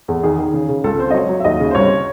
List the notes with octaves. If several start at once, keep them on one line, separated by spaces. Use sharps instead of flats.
E2
D#3 G#4
D#3
C#3
C#3
C#2 A4
C4 C5
D#5
F#3 C#5
F#3
E5
D#2 D#5
C#3
C5
C2 C#5